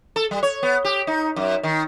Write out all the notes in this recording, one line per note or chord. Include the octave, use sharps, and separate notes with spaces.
A4
G3
C#5
B3
G4
D#4
F#2
D#3